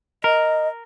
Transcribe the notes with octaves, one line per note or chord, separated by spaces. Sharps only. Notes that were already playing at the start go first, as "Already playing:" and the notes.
A#4 D#5